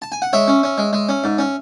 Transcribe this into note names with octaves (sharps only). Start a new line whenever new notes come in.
A5
G#5
F#5
G#3 C#5 E5
C#4
C#4
G#3
G#3
C#4
G#2
C#4